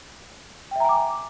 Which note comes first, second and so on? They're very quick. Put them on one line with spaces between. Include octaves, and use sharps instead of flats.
G5 E5 A#5 G#5 D6